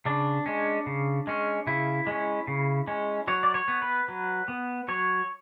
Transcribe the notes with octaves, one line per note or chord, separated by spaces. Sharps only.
C#3 D4
G#3 C#4
C#3
G#3 C#4
C#3 E4
G#3 C#4
C#3
G#3 C#4
F#3 C#5
D5
C#5
B3
B4
F#3
B3
F#3 C#5